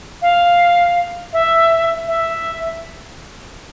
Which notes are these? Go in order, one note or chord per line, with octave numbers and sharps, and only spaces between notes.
F5
E5
E5